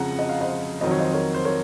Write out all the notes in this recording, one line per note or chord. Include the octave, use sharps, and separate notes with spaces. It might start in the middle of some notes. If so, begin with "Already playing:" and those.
Already playing: F2 C#3 F3 F#5 A#5
D#5
F5
C5 D#5
F2 D#3 F#3 D#5
C#5
C5 D#5
A#4 C#5
C5
A#4 C#5